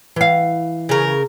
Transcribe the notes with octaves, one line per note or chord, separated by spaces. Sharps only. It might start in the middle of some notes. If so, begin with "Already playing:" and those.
E3 F5
C#3 A#4